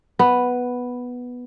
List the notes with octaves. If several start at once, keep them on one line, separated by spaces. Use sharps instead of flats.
B3